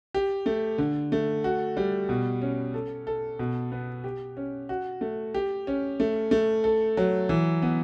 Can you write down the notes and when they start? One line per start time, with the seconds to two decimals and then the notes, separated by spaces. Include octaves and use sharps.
0.14 G4
0.46 A3
0.78 D3
1.12 A3
1.44 F#4
1.77 G3
2.09 B2
2.42 C#4
2.74 A4
3.07 A4
3.39 B2
3.72 B3
4.04 G4
4.37 C#4
4.69 F#4
5.01 A3
5.34 G4
5.67 C#4
6.00 A3
6.31 A3
6.64 A4
6.97 F#3
7.29 E3
7.62 B3